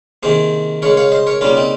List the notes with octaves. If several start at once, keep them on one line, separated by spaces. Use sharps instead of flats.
C3 D#3 A#3 G#4 C5
C#3 G#3 A#4 C#5
C#5 F5
C5 D#5
A#4 C#5
C#3 G3 A#3 C#4 F4
C4 D#4